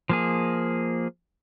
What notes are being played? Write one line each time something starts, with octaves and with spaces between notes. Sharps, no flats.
F3 A#3 G#4